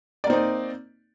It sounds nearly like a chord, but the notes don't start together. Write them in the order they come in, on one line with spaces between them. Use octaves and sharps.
D5 A#3 C4 D#4